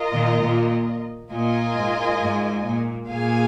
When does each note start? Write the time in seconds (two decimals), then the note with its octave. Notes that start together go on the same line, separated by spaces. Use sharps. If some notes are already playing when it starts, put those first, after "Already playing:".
Already playing: F4 A#4 D#5
0.14 A#2 D#3
0.43 A#2
1.32 A#2 F4 A#4 D#5 G#5
1.76 G#2
2.20 G#2
2.65 A#2
3.08 A#2 G#4 F5 G#5